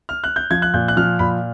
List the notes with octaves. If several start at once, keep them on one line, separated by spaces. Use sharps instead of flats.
F6
F#6
G6
F3 G#6
F#6
A#2 G6
F#6
F3 F6
A#2 B5